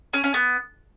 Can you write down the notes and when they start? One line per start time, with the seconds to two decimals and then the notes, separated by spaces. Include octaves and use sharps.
0.13 C#4
0.24 C#4
0.34 B3